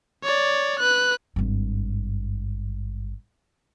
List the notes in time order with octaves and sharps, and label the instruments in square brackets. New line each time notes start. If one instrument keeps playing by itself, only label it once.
[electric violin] C#5 D5
B4 F#6
[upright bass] G#1 G2